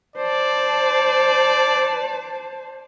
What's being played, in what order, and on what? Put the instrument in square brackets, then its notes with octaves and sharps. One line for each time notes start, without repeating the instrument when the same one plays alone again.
[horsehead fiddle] C5 A5 [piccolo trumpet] D5